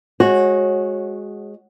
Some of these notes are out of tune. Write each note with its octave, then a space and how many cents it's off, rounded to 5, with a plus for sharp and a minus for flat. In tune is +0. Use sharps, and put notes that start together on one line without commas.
G#3 +0 F#4 +0 C#5 -25